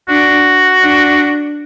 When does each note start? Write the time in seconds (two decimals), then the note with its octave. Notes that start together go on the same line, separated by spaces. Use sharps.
0.09 D4 F#4
0.81 D4